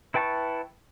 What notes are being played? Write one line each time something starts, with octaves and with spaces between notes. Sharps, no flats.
E4 B4 G5 A5 C#6